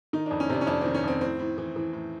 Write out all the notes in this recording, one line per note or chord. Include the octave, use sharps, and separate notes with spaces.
D#3 D#4
F2 D4
C#4
C3 D4
C#4
F2 D4
D#3 C4
C#4
F2 C4
A2 C4
A2
E3
E3
A2